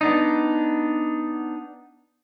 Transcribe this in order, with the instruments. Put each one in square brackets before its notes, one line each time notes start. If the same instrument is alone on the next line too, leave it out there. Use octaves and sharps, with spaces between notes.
[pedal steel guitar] B3 D4 D#4